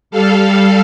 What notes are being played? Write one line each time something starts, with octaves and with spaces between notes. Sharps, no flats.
G3 A4 F5